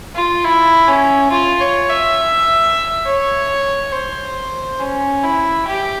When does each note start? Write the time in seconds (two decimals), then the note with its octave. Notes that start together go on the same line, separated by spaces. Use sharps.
0.16 F4
0.45 E4
0.88 C#4
1.31 F4
1.61 C#5
1.89 E5
3.06 C#5
3.92 C5
4.80 C#4
5.23 E4
5.67 G4